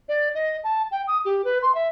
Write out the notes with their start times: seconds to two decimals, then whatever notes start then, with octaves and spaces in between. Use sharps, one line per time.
0.09 D5
0.35 D#5
0.64 A5
0.91 G5
1.08 D#6
1.25 G4
1.45 B4
1.62 C6
1.75 E5